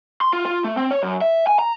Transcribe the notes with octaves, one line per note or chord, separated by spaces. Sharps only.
C6
F4
F4
A3
C4
C#5
F#2
E5
G#5
A#5